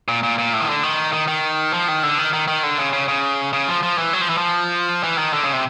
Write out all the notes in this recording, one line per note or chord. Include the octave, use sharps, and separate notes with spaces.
A#2
A#2
A#2
A2
D#3
D3
D#3
D#3
D#3
F3
D#3
D3
D#3
D#3
D#3
D3
C#3
C#3
C#3
C#3
F3
F3
E3
F#3
F3
E3
F3
E3
D#3
D3
C#3
C3